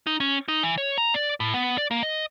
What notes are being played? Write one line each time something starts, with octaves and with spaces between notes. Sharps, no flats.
D#4
C#4
D#4
E3
C#5
A#5
D5
A2
B3
D5
A#3
D#5